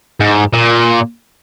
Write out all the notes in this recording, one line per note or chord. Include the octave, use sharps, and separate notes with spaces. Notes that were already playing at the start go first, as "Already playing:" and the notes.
G#2
A#2